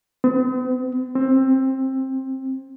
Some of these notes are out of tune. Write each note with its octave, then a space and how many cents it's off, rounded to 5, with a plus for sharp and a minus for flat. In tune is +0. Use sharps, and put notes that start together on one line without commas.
C4 -45
C4 +20